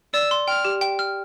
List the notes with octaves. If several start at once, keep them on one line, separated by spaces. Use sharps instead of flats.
D5 E6
C6
G5 F6
G4
G5
F6